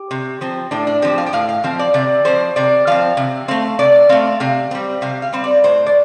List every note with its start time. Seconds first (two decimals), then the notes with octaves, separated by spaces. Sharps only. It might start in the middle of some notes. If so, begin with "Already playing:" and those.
Already playing: G4
0.11 C3
0.41 F3 C4
0.71 A2 D4
0.87 D4
1.02 F3 C4 G4
1.18 F5
1.26 G5
1.33 A2 F5
1.49 F5
1.64 F3 C4 F5
1.79 D5
1.94 C3 D5
2.25 F3 C4 C5
2.56 C3 D5
2.87 F3 C4 F5
3.17 C3
3.48 A3 C4 F5
3.79 C3 D5
4.09 A3 C4 F5
4.40 C3 F5
4.71 G3 C4
5.02 C3 F5
5.22 F5
5.33 G3 C4
5.44 D5
5.64 A2 C5
5.86 D5